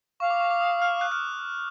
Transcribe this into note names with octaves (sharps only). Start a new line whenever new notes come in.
F5 C#6
D6
C#6
D6
D#6
F6
F#6
F6